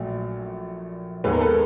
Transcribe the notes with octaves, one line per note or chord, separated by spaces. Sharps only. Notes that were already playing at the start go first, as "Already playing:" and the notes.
Already playing: A#1 A#2 F#3 A3
D#2 D#3 G#3 B3 B4
A#4
A4 B4